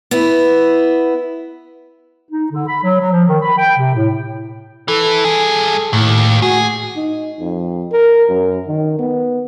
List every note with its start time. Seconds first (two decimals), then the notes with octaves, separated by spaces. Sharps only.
0.11 B3 E4
2.30 D#4
2.52 D3
2.67 B5
2.83 F#3
3.00 F#3
3.11 F3
3.28 D#3
3.42 B5
3.58 G5
3.78 C3
3.95 A2
4.88 E3 A4
5.25 G2 G#4
5.93 D#2 A2
6.42 F#4 G#4
6.96 D#4
7.40 F2
7.92 A#4
8.29 F#2
8.68 D#3
8.99 B3